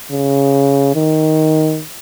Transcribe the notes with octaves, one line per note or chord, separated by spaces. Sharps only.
C#3
D#3